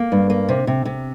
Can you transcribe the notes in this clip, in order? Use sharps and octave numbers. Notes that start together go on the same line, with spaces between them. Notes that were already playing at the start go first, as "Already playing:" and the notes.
Already playing: A#3
G2
A#3
C3
C3
C3